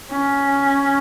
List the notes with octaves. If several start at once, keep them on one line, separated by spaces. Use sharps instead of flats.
C#4